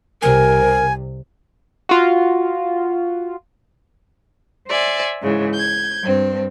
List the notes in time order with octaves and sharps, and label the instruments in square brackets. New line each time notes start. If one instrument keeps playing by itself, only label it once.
[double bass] C2 C3 [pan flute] A#4 [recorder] G#5
[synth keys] F4 F#4
[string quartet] C5 D5 E5 G#5
G#2 C#3 E3
G6 G#6
G2 C4